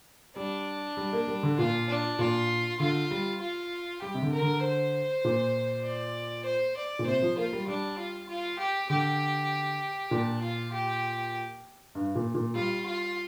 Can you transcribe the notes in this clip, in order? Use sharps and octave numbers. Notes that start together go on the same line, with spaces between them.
G3 D4
G3
A#3
G3
D3
A#2 F4
D4
A#2 F4
D3 F4
G3
F4
G3 G4
C3
D3
A#4
D3
C5
A#2
D5
C5
D5
A#2
C3 C5
F3
A#3 F4
G3
G3 D4
F4
F4
G4
D3 G4
A#2 D4
F4
G4
G2
A#2
A#2
G3 F4
F4